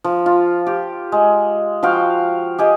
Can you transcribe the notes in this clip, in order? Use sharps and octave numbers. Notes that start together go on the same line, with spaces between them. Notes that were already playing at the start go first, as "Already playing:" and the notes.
F3
F4
G4
G#3
F3 F#4 F5 G5
G4 G#4 D#5